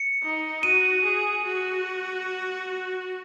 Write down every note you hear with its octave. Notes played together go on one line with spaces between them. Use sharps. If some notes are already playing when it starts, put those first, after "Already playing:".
Already playing: C#7
D#4
F#4 D#7
G#4
F#4